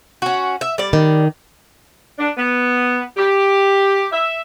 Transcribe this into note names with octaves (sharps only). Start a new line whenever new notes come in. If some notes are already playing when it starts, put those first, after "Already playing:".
C#4 F#4
E5
G3 D5
D#3
D4
B3
G4
E5